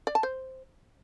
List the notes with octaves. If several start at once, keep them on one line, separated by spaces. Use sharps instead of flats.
D5
A5
C5